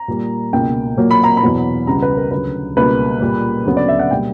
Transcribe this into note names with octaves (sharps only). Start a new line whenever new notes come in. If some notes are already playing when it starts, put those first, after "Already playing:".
Already playing: A#5
A#2 G3 A#3
C#2 B2 A#3 G5
A#2 F#3 A#3
B5
A#5
B5
E2 B2 F#3 B3
C#2 C#3 G3 B3 A#5
B4
A#4
D2 C#3 F#3 B4
C#2 B2 G3 A#3 B4
A#2 G3 A#3
D2 C#3 F#3 B3
D5
E5
F#5
B2 G3 A#3 G5